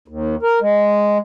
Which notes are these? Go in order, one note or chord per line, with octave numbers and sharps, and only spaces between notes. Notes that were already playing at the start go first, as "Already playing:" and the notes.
D#2
A#4
G#3